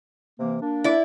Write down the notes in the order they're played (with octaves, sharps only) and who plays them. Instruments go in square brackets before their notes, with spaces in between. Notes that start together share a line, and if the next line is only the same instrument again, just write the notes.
[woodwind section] C3 E3 A#3
A#3 D4
[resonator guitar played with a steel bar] E4 D5